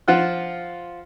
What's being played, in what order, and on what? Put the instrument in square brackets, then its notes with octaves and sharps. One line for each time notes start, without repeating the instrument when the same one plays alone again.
[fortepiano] F3 F4 F#5 F#6